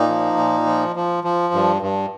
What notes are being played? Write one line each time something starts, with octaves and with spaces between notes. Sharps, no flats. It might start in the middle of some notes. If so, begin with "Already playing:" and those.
Already playing: A#2 A#3 D#4
F3
A#2
F3
F3
F3
G2
G2